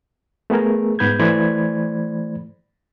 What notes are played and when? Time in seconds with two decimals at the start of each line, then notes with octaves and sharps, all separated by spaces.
0.50 A3 B3 G#4 A#4
0.99 G#2 B3 B5 G6 G#6
1.19 E3 A3 C5 D5 B5 G#6